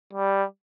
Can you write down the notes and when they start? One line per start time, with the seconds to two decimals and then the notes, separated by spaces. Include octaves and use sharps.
0.14 G3